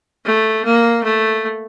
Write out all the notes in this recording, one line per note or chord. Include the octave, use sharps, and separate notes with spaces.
A3
A#3
A3